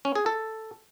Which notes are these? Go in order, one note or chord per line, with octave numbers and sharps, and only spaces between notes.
C#4
G#4
A4